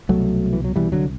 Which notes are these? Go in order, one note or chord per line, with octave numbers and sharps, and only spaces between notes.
C2 B2 F#3 A3
E3
F#3
C2 B2 E3 G3
D3 F#3